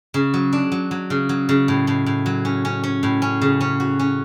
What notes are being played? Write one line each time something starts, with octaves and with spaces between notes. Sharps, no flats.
C#3
F#3
D4
F#3
F#3
C#3
F#3
C#3
A2
A2
A2
F#3
C#4
C#4
C#4
A2
C#4
C#3
C#4
F#4
C#4